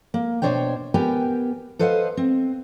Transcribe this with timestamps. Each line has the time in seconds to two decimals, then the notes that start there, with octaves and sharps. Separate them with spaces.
0.14 A#3
0.42 B2 D#3 D4 C5 C#5 G5
0.94 B3 G4 A#4 G5 G#5
1.79 A4 B4 C5 D#5 F5 F#5
2.17 C4